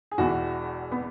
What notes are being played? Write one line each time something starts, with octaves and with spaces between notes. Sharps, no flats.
G#4
E1 E2 E3 F#4
B3